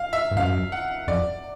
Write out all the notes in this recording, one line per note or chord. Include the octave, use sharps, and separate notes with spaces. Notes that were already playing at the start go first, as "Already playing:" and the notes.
Already playing: F5
E5
G2
F#2 F5
F#5
F2 D5